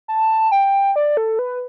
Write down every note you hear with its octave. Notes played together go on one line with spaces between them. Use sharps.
A5
G5
D5
A4
B4